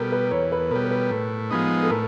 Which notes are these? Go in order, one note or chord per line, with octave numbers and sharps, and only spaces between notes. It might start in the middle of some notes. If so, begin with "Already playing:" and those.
Already playing: B2 G3 A4 A#4
B4
E2 C#5
B4
B2 G3 A#4
B4
A2
F3 G#3 B3 D#4
A4
A2 A#4